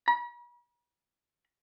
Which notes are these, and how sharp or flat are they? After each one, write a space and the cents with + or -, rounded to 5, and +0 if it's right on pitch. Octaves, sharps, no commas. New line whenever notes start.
B5 -45